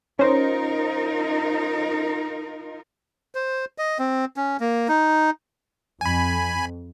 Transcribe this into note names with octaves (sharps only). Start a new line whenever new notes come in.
C#4 D#4 F4 A#4 C5
C5
D#5
C4
C#4
A#3
D#4
F2 G#5 B5